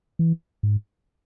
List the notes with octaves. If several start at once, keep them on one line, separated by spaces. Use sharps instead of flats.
E3
G#2